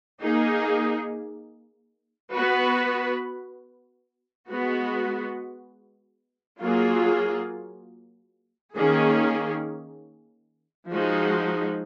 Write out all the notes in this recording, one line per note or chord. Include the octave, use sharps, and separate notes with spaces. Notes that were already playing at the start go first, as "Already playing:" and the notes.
A#3 D#4 G#4
B3 F#4 B4
G#3 B3 F#4
F#3 A#3 F4 G#4
D#3 A#3 C#4 G#4
F3 G#3 D#4 F#4